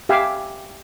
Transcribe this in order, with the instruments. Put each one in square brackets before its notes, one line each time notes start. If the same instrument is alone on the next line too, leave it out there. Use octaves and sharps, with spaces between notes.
[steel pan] G4 E5 F5 G#5